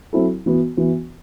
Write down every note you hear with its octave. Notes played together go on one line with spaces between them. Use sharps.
F#3 C4 E4 A4
E3 B3 F#4
E3 B3 F#4